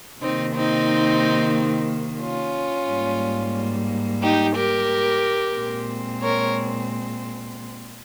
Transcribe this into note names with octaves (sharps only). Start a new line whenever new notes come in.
C3 D#3 A#3 C4 D#4
C4 D#4
C#4 F4
G#2 G3 A#3
D#4 G4
G4 A#4
A#2 G#3 C4
A#4 C#5